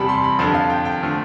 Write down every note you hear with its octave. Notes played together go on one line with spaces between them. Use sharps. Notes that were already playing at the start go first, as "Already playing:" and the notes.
Already playing: E2 C3 G3 A5 B5
C6
B5
F2 D3 F3 A5
F5
G5
G5
D3 F3 A3